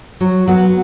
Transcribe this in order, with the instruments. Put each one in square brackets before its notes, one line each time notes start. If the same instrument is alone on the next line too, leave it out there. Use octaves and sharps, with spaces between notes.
[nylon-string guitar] F#3
F#3 B3